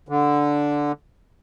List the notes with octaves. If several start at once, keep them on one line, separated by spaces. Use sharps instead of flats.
D3